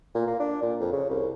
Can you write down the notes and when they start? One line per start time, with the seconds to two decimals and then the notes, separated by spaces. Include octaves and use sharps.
0.15 A#2
0.27 A#3
0.39 D4
0.62 A#2
0.80 F2
0.93 C#3
1.10 C2